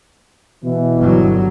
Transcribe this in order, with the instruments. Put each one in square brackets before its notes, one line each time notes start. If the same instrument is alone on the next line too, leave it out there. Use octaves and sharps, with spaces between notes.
[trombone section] B2 E3
[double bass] G1 F#3